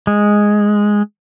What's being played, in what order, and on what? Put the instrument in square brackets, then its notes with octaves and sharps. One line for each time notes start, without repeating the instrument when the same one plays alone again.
[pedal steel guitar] G#3